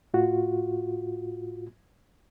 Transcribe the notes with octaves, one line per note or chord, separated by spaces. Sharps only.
A2 F4 F#4